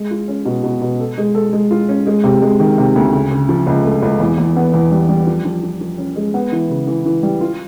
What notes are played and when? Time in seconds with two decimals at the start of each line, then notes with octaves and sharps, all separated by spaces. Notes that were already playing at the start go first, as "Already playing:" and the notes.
Already playing: G#3
0.11 F4
0.28 C#4
0.45 B2
0.64 B2
0.81 B2
1.00 A4
1.18 G#3
1.35 A4
1.53 G#3
1.71 F4
1.89 C#4
2.07 G#3
2.24 C3
2.42 G#3
2.60 D#3
2.78 C3
2.96 D2
3.13 C#3
3.31 C#3
3.49 F3
3.67 C#2
3.84 A3
4.02 C#2
4.20 E2
4.38 E2
4.56 B3
4.74 E2
4.91 G3
5.09 G3
5.27 F3
5.45 F3
5.63 F3
5.81 F3
5.98 C#4
6.16 G#3
6.34 B3
6.52 E3
6.70 C#3
6.87 E3
7.06 E3
7.23 G3
7.41 F4